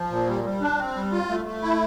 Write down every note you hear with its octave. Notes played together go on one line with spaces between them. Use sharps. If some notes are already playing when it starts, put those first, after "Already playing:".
Already playing: F3
A#2
G3
G3
D4
C4
G3
F4
A3
A3
E4